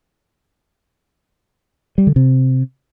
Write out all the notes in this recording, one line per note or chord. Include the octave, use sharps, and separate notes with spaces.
G3
D3
C3